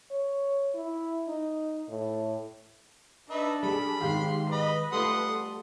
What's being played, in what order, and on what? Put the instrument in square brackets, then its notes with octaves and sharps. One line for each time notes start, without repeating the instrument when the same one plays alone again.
[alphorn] C#5
E4
D#4
A2
[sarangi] D4 [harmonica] D#4 B4 E5
[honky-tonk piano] G3 G#4 [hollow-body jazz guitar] A4 [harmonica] B5
[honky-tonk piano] G#2 G4 F5 [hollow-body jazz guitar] D#3 G#3 [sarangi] C6
[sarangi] B4 [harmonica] D#5 B5
[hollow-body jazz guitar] G3 A3 F4 [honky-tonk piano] A4 [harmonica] F#5 C6 D#6